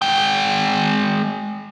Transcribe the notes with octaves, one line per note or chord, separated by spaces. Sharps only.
G#3 G5